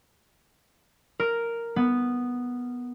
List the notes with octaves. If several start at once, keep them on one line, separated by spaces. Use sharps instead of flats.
A#4
B3